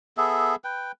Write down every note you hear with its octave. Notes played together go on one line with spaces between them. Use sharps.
B3 G#4 A4 E5
B4 G5